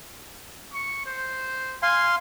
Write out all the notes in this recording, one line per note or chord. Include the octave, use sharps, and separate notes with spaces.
C#6
C5
F5 G#5 C6